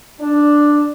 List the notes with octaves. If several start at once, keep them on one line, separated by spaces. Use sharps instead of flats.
D4